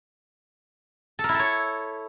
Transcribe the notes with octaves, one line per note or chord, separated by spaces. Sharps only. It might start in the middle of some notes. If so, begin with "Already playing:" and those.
A4
A#4
E4
A4
C#5